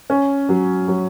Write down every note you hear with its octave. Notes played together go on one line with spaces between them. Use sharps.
C#4
F#3
F#3